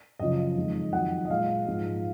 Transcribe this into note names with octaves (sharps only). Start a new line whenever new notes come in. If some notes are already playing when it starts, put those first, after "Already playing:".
F#2 C#3 F3 D#5
F2 D#3 G#3
F2 D#3 F#3 F#5
D#5
A#2 G#3 F5
G#2 F3 G#3